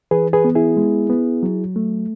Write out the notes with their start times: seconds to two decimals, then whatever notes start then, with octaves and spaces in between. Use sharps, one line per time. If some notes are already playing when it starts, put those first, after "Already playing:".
0.11 E3 G#4 B4
0.33 G#4 B4
0.45 B3
0.55 E4 G#4
0.77 G#3
1.10 B3
1.43 F#3
1.76 A3